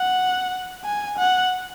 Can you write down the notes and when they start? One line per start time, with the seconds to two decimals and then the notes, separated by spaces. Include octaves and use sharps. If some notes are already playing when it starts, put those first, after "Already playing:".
Already playing: F#5
0.85 G#5
1.18 F#5